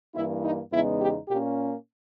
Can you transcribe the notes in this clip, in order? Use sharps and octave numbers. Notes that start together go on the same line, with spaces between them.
G2 E3 A#3 E4
D#4
E2 C#3 G#3 B3 D#4 E4
G4
A#2 A#3 C#4 G4